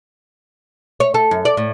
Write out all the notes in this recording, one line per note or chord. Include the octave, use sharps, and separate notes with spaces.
C#5
A4
F#2
D5
A2